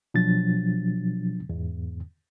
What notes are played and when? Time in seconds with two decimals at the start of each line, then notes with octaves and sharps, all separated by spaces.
0.14 B2 F3 F#3 D4 A6
1.49 E2 G#2